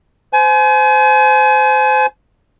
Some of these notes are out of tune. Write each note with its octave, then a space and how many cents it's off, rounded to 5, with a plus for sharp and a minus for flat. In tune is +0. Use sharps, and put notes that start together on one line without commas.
C5 -25 G#5 +35